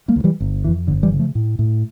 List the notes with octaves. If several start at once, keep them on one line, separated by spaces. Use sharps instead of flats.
G3 A#3
D2
E3 G3
G1
F2 E3
G1 D3
E3 G3
C#3
F3 A3
A2
A2